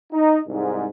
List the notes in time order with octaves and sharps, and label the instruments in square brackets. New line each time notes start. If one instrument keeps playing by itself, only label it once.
[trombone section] D#4
C2 G#2